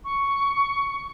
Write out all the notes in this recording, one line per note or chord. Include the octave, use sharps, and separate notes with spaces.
C#6